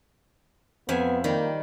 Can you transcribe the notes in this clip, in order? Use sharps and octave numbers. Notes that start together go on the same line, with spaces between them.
F2 B3 E5 G#5
D#3 G3 A#3